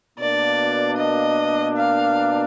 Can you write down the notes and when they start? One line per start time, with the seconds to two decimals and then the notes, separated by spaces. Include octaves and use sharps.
0.19 B2 A#3 D4 D5
0.97 D#5
1.77 F5